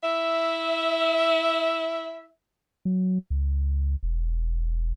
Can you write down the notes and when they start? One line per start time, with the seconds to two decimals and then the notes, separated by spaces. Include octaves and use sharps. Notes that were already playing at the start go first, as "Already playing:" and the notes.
0.02 E4 E5
2.85 F#3
3.30 C#2
4.03 E1